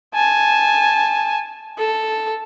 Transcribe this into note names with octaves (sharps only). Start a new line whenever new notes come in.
G#5 A5
A4